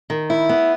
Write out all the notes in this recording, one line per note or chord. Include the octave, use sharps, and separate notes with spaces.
D#3
E4
B3